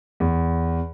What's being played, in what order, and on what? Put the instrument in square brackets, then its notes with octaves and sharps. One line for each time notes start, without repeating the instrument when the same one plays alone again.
[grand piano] E2